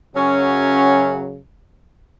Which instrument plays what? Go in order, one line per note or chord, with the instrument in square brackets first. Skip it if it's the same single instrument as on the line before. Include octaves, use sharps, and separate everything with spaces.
[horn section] F#2 C#3 F#3 C#4